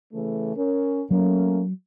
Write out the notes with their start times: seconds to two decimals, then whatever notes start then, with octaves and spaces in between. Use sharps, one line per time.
0.13 C#3 E3 A3
0.56 C#4 A#4
1.11 F#3 A3 A#3 C#4